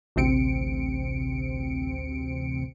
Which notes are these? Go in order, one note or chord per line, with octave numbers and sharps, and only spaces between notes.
A1 D2 C3 C4 C#7 D7